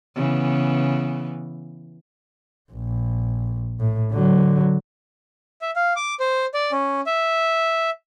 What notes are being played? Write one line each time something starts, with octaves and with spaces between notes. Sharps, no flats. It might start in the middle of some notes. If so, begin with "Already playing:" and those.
C#3 E3 B3
A#1
A2
D3 F#3
E5
F5
D6
C5
D5
C#4
E5